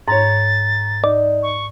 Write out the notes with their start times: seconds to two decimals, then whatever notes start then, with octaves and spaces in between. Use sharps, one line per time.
0.08 G#2 C#5 A#5 A6
1.04 D#4 D5
1.43 C#6